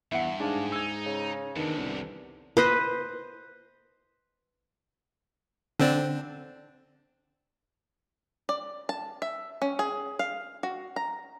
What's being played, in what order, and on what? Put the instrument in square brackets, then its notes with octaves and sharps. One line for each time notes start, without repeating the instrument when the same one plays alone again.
[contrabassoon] E2 [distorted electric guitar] G2 [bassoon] E4 [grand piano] E5 F#5
[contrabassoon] G#2 [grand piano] D4 F5 [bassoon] G#4
[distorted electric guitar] D#4 [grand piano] E6 G#6
[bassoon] C#3
[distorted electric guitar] E2 C3 [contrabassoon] D#3 [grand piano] B3 D4
[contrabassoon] C2 [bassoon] D3
[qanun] B4 C5 D#5
[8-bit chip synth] D3 C4 D4
[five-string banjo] D5
A5
E5
C#4
G#4
F5
F#4
A#5